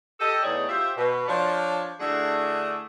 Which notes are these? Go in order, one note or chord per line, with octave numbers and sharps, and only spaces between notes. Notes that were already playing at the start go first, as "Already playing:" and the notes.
G4 A4 D#5
E2 A3 D#4 G#4 C#5 D5
F4 G4 C5 E5
B2
F3 D4 C#5
D3 A3 D4 E4 F#4 G#4